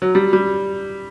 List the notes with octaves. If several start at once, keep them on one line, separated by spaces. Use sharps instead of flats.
F#3
G3
G3